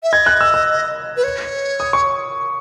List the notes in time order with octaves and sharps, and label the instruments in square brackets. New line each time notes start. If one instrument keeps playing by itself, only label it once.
[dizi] E5
[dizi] D#5 [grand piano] G#6
[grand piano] F#6
E6
E6
[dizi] B4
C#5
[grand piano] D#6
C#6